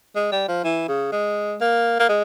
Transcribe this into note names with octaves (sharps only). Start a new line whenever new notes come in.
G#3
G3
F3
E3
C#3
G#3
A#3
A#3
G#3